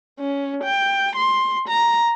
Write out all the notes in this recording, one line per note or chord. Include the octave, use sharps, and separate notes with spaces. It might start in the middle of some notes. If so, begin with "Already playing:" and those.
C#4
G5
C6
A#5